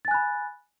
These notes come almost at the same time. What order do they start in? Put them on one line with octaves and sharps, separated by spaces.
A6 G#5 F#6 B5